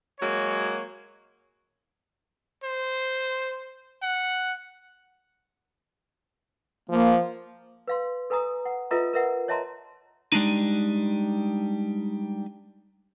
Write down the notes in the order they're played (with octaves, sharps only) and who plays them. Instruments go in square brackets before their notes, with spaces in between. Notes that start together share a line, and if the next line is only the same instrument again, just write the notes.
[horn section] F#3 G#3 A#3 C#5
[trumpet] C5
F#5
[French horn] F3 [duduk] A#3
[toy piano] B4 F5 C6
A4 B4 G#5 A#5 D#6
F#5
F4 A4 B4 D#5 E5 A#5
A#4 B4 E5 F#5
C#5 D#5 E5 A5 A#5 C6
[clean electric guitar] G3 G#3 D4 D#4